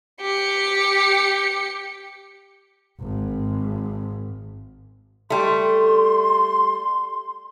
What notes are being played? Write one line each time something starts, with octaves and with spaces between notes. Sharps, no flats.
G4 C#7
G#1 G#2
G3 A3 C6